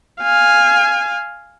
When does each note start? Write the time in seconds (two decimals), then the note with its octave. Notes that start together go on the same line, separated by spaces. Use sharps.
0.21 F5 G#5